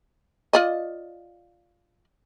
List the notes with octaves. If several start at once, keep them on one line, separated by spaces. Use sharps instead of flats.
F4 D5 D#5